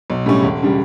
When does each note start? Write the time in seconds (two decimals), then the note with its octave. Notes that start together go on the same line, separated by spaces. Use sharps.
0.10 B1
0.26 A2 G3 C#4
0.43 E1
0.63 C#3 G3